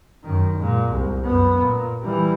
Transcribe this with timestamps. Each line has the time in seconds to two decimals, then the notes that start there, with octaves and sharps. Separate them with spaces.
0.24 F#2 D#3
0.57 A#2 G#3
0.90 C2
1.25 F#2 B3
1.60 A#2
2.01 E3 G3